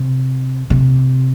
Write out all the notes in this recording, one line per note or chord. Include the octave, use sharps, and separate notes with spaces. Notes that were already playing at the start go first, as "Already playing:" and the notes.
Already playing: C3
C3